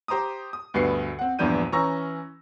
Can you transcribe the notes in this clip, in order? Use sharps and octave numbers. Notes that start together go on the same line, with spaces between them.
G4 C5 A#5 D6 D#6
D#6
D2 G2 B2 B4 C7 C#7
C4 F#5
A#1 E2 G2 D4 G6 D#7
E3 C#4 A#5 C#6 E6 A#6